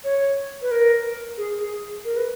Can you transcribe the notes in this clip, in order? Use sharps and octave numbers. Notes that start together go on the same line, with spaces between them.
C#5
B4
A#4
G#4
G#4
A#4
B4